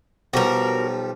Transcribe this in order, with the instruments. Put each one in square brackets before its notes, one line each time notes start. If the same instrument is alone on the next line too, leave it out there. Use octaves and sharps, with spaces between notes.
[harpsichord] B1 F3 G3 [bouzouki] F#4 A#4